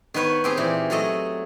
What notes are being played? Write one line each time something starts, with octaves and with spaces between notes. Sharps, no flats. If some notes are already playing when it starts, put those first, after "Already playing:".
D#3 B3 B4 C#5
C4 G4 G#4
A#2 E3
F#3 A3 A4 D#5